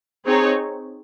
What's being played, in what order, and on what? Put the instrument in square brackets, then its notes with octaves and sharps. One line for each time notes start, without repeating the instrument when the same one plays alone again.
[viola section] C4 D#4 G#4 C#5